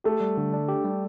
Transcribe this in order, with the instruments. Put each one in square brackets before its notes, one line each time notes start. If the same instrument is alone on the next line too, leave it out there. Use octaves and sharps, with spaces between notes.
[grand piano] A3 [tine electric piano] G4
[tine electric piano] G3
D3
D4
G4
G3